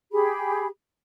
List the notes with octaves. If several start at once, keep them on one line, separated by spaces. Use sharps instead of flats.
G4 G#4 B5